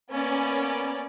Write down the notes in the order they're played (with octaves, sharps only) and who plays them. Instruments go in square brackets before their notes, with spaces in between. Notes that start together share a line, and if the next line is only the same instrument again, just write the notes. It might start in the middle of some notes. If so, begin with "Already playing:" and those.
[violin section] A#3 B3 C#4 D5